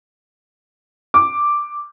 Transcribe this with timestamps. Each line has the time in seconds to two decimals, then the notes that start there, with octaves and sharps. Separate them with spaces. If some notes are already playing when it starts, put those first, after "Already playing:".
1.14 D6